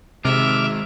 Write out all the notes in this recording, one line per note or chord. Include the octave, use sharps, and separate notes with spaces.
C3 D#3 G#3 E5 D6 F6